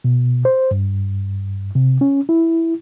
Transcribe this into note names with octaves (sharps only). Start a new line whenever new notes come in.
B2
C5
G2
C3
C#4
E4